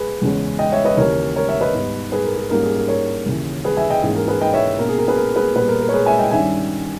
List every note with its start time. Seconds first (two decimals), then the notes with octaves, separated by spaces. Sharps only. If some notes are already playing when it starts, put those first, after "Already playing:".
Already playing: G#4 B4
0.22 E2 C#3 G#3 C#4
0.59 D#5 G5
0.72 C#5 E5
0.85 B4 D#5
0.97 D#2 C#3 E3 A#4 C#5
1.36 A#4 C#5
1.48 C#5 E5
1.61 B4 D#5
1.74 G#2 G3 B3
2.12 G#4 B4
2.24 A#4
2.37 G#4
2.50 G#2 G3 A#3 C#4 A#4
2.63 G#4
2.75 A#4
2.88 A#4 C#5
3.26 D#2 C#3 E3
3.64 G#4 B4
3.77 E5 G#5
3.90 D#5 G5
4.03 G#2 E3 A#3 C#4 G#4
4.15 A#4
4.28 G#4 B4
4.41 D#5 G5
4.53 C#5 E5
4.78 B2 A#3 C#4 A#4
4.89 G#4
4.98 A#4
5.07 G#4 B4
5.17 A#4
5.36 G#4 B4
5.55 A#2 G3 B3 G#4 B4
5.68 A#4
5.81 A#4
5.89 C#5
5.93 G#4 B4
6.06 E5 G#5
6.19 D#5 G5
6.31 G2 D#3 G3 C#4 E5 G#5